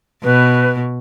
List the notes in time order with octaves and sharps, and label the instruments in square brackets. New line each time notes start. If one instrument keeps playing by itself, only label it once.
[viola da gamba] B2 [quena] B4